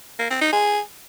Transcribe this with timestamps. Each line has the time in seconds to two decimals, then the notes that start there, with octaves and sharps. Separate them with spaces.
0.19 A#3
0.30 C4
0.42 D#4
0.53 G#4